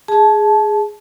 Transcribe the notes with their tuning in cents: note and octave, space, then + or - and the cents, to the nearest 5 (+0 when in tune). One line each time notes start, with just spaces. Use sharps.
G#4 +0 A5 -20